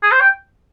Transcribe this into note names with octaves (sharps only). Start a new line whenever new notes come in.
G#4
C5
G5